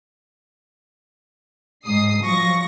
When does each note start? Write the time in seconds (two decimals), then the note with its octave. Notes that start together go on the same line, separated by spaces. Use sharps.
1.85 G#2 D#6 C7
2.23 F3 F#3 C#6 A#6